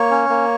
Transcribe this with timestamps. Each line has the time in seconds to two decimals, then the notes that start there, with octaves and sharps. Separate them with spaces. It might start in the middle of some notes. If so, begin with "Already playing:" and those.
Already playing: A#3 C#5
0.11 C#4
0.29 A#3